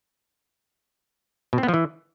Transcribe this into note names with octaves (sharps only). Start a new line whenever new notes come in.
B2
C4
B3
F3
E3